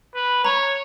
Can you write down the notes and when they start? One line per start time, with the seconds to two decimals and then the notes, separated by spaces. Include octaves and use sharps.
0.15 B4
0.44 C#5 A#5